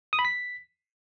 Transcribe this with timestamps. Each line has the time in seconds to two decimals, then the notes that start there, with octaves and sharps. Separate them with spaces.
0.13 D#6
0.19 B5
0.25 B6